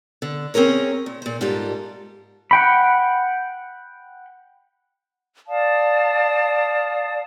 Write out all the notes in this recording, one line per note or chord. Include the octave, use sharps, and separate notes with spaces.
D3
C4 C#4 G#4 A#4 C#5
A#2
A#2 C5
G#2 G3 F4 G4 A4 A#4
F#5 G5 B5
D5 F5 A5 D#6